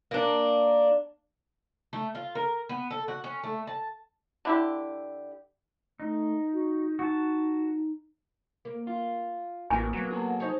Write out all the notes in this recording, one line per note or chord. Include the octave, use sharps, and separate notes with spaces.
A#3 D4
A3
F4
A#4
B3
A4
F#4
C#4
A3
A5
D3 E4 G4
A3 D#4
F#4
D#4 F#4 A5
A#3
F4
A1 A#3 F#4 G#5
F#3 A#3 B3
G#4 A4
D#4 C5 C#5